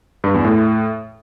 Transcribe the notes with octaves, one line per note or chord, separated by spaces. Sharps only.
G2
E2
A2